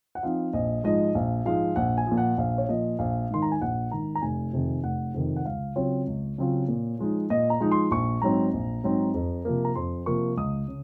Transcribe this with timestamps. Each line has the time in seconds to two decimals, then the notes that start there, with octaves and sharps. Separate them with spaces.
0.15 F#5
0.23 F3 C4 D#4 F5
0.53 A#1 D#5
0.84 G#2 F3 G#3 D#5
1.15 A#1 F5
1.45 G#2 F3 G#3 F5
1.76 A#1 F#5
1.98 G#5
2.07 A#2 F3
2.18 F#5
2.38 A#1 F5
2.58 C#5
2.69 A#2 F3 D#5
2.99 A#1 F5
3.30 G#2 D#3 C6
3.42 A#5
3.52 G#5
3.62 A#1 F#5
3.91 G#2 D#3 A#5
4.15 A#5
4.22 F1 G#5
4.53 F2 C3 D#3
4.84 F1 F#5
5.14 F2 C3 D#3
5.36 F#5
5.45 C#2 F5
5.76 C#3 F#3 C4 F4 C#5
6.07 C#2
6.38 C#3 F#3 C4 F4
6.68 A#2
6.99 F3 G#3 D#4
7.30 A#2 D#5
7.50 A#5
7.60 F3 G#3 D#4
7.72 C6
7.91 A#1 C#6
8.22 G#2 F#3 C4 A#5
8.54 A#1
8.84 G#2 F#3 C4
9.14 F2
9.45 C3 F3 A#3
9.65 A#5
9.75 F2 C6
10.06 C3 F3 A#3 C#6
10.37 C#2 D#6
10.68 C#3